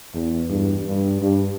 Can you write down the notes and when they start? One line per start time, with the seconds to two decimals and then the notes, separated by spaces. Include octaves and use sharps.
0.14 E2
0.50 G2
0.86 G2
1.22 G2